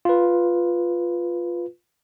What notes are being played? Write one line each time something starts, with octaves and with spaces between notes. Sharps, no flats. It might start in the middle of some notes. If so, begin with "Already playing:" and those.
F4 B4